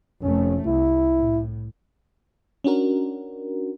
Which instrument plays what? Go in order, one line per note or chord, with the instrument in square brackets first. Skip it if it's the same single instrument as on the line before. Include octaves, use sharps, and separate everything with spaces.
[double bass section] F1 A3 [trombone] C#4
[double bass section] C2 [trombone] E4
[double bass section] A2
[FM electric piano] C#4 D4 F#4 A#4